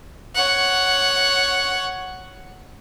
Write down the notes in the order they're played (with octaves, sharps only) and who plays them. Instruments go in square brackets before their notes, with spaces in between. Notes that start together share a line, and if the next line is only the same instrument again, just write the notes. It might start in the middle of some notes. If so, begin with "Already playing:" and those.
[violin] C#5 F#5